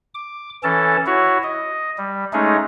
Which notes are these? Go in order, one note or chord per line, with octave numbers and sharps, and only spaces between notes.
D6
E3 C#4 A4 A5
E4 F#4 C#5
D#5
G3
G#3 A3 C#4 D#4 G#4